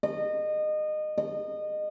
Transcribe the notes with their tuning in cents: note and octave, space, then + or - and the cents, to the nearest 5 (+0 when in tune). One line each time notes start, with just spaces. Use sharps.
D#5 -25
D#5 -25